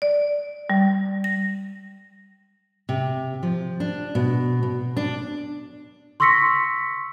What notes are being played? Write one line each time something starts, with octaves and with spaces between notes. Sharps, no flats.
D5
G3
A#6
C3
F3
D4
B2
B2
D4
C6 C#6 E6 A#6 B6 C#7